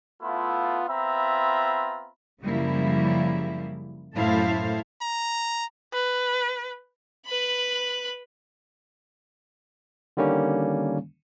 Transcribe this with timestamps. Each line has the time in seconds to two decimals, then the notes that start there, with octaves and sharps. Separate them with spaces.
0.22 A3 B3 E4 F4
0.89 B3 C4 F4 E5 A#5 B5
2.42 F#2 C#3 F3 G3 A#3 E4
4.14 F#2 A2 E4 A4 C5 F5
5.02 A#5
5.93 B4
7.26 B4 B5
10.17 D3 D#3 G3 A#3 C#4